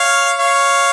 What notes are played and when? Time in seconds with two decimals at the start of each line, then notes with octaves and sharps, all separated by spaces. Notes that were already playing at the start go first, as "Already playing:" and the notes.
Already playing: C#5 F5
0.39 C#5 F5